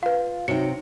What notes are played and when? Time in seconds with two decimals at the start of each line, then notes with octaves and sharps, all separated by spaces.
0.03 F4 B4 F5
0.48 C3 F#3 D#4 G5 C#7